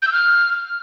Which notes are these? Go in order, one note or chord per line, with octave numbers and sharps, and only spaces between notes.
G6
E6
F6